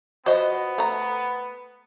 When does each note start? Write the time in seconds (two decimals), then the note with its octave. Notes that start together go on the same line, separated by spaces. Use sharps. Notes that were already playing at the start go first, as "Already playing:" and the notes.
0.26 F3 B3 F#4 C5 D#5 F5
0.78 A3 A#5